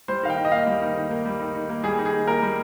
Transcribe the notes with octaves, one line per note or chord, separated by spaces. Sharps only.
G3 C5
D#3 F5
G5
D#3
D#5
A#3 F5
G3
D#3
D#3
A#3
G3
D#3
D#3
A#3
G3 G#4
D#3
G#4
D#3
A#3 A#4
G3